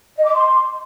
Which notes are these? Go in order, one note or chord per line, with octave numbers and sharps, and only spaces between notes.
D#5
D6
C6